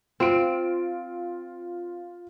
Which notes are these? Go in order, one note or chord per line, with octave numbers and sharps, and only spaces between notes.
C4 F4 D7